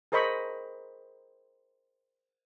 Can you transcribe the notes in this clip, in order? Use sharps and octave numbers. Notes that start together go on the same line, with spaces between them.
G#4 A#4 C5 D#5 B5 C#6